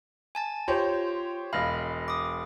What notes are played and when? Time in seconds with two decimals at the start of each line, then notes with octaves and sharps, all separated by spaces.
0.35 G#5 A5 A6
0.68 F4 G4 C5 C#5
1.53 E1 D#5 F5 B5 F6
2.08 D6 D#6